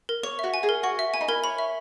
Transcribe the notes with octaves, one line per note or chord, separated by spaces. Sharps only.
A#4
C#5 C#6
F#4 E5
G#5
G#4
A#4
F#4 C#6
E5
E4 G#5
D#4
E4 A#4
C#5 B5
E5